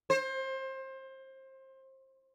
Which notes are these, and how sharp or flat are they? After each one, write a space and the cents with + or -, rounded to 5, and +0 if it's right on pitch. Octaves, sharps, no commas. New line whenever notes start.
C5 +25